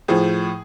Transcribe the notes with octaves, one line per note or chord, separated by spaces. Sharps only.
A2 F3 G#4